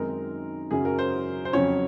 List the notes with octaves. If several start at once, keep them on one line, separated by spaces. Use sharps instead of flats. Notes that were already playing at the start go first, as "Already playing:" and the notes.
Already playing: F#2 D#3 G#3 C4 D#4 A#4
F#2 C#3 F#3 G#4
A#4
C5
C5
F2 C#3 F#3 C#4 C#5